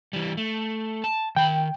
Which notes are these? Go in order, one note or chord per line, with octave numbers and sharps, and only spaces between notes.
E3 G3
A3
A5
D#3 G5 B5